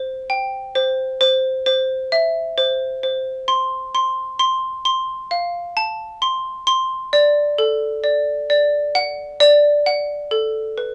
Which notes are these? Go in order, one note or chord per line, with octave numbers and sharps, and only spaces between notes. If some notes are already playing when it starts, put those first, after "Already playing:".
Already playing: C5
G5
C5
C5
C5
E5
C5
C5
C6
C6
C6
C6
F5
A5
C6
C6
D5
A4
D5
D5
F#5
D5
F#5
A4
B4